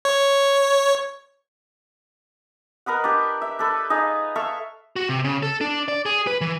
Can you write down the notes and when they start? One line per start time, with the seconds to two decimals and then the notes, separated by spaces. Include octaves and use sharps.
0.05 C#5
2.86 A#4 B4 D#5 F#5
3.04 D4 G4
3.42 E5
3.59 D4 A4 B4
3.90 D#4 G#4 D#5 F5
4.36 A4 E5 F5 C#6
4.96 F#4
5.09 C3
5.24 C#3
5.43 A4
5.61 D4
5.88 D5
6.06 G#4
6.27 B4
6.41 E3